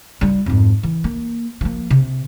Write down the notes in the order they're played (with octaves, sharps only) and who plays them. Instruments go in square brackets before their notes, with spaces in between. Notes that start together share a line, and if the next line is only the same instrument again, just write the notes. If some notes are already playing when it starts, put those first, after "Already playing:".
[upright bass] G3 F4
F2 G#2
E3
A#3
F3 A#3
C3